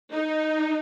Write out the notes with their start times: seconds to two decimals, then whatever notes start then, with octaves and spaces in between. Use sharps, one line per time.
0.11 D#4